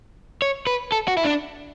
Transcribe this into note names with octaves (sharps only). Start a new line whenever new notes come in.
C#5
B4
A4
F#4
E4
D4